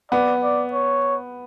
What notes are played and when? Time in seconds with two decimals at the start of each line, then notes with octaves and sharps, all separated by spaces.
0.12 B3 D5
0.43 D5
0.73 C#5